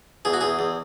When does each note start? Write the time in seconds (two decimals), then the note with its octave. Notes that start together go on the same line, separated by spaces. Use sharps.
0.25 E2 G#4
0.33 F#4
0.41 E2 G#4
0.59 E2